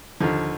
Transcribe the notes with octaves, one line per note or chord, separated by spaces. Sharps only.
D#2 D3 F3